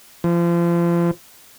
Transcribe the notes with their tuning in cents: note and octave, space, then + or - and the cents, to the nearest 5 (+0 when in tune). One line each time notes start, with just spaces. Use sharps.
F3 -30